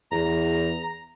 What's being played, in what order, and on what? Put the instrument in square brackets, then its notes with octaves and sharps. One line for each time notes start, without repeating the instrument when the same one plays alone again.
[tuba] E2 [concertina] A#5